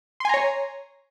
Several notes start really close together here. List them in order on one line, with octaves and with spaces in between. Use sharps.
C6 G#5 A#5 C#5